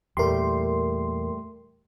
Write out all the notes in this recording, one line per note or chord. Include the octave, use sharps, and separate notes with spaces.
E2 A#2 G3 A3 G4 A#4 C6